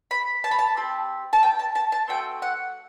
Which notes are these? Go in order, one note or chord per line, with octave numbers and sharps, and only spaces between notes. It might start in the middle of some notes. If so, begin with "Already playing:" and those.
B5
A5
B5
A5
C4 G4
A5
G5
A5
A5
A5
A3 C4 F#4 G5
F#5